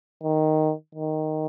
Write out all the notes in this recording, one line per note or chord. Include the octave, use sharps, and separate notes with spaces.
D#3
D#3